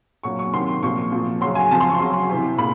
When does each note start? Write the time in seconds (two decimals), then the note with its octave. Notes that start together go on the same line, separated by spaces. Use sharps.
0.23 A#2 F#3 C#6
0.39 C#6
0.53 C3 D#3 F#3 C6
0.83 A#2 F3 C#6
1.12 A#2 F3
1.41 C#3 F#3 C6
1.55 G#5
1.71 C#3 F3 A5
1.80 C6
1.90 C#6
1.99 C#3 F#3 C6
2.29 C3 E3
2.58 A#2 B5